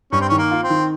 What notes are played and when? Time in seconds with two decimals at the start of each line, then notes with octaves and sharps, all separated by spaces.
0.12 G2 C#4
0.21 C4
0.29 D#3 C#4
0.38 A#3
0.51 F4
0.63 C4
0.70 D#3